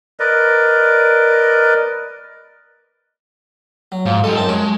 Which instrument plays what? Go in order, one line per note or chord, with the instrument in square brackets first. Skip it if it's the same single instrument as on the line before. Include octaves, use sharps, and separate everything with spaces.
[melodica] A#4 B4 D5 D#5
[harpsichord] F#3
[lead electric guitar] G#2 [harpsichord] F3
[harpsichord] G#3 D#5 [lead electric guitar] G4 A4
[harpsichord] F#2 C4 D#4 [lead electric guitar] A5
[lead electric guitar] G#3 [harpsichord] C#5